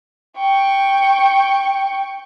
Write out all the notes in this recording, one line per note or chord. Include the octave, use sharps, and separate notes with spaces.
G5 C#6